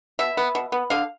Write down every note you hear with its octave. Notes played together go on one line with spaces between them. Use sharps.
B2 E5
B3
B2
B3
D3 F5